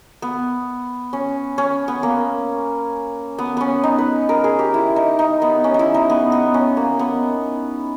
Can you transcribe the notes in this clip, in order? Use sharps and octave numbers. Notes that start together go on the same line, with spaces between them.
B3
C#4
C#4
B3
A#3
B3
B3 C#4
D#4
B4
A#4
G#4
G4
E4
D#4
D#4
B3
C#4
D#4
E4
D#4
B3
B3
C#4
A#3
B3